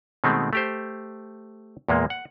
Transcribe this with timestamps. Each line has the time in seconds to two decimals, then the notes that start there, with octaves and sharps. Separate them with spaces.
0.24 B2 D#3 G#3 A3 C4
0.53 A3 G4 C5
1.89 E2 A#2 G#3 A#3
2.10 F#5